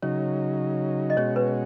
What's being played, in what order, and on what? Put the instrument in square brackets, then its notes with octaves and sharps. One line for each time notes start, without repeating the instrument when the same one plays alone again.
[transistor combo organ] C#3 F#3 D#4 [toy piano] C#5
[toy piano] D#5
[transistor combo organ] B2 G#3 C#4 F#4 [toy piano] C#5
[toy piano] B4